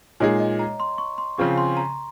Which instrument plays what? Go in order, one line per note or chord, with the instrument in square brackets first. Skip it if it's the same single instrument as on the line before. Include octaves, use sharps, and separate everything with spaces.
[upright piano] A#2 G#3 D#4 G#4 [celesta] C#5
[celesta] D#5
A#5
C6
C#6
C6
[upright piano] C#3 F3 C4 F4 G#4 [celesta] C#6
[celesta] C6
A#5